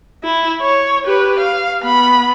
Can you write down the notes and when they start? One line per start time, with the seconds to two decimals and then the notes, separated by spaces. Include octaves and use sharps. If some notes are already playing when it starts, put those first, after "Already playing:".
0.23 E4
0.61 C#5
1.04 G4 B4
1.40 F5
1.81 B3 B5